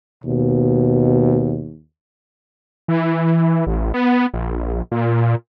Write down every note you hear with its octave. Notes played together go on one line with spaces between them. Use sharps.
D#2 B2
E3
A1
B3
A#1
A#2